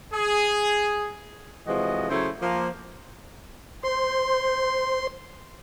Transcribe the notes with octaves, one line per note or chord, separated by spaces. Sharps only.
G#4
C3 E3 F3 G#3 F#4 D#5
C#3 F#3 A3 E4 C5 C#5
F3 A#3
C5 C6